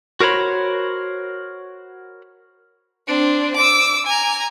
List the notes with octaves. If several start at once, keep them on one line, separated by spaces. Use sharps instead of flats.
F#4 A#4 C5 C#5 B5
C4 D4
D6 E6
G#5 A#5